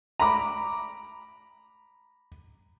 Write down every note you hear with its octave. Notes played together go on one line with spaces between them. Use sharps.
A#5 B5 D6